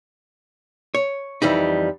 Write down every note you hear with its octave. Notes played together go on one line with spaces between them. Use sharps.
C#5
F2 E3 G3 D#4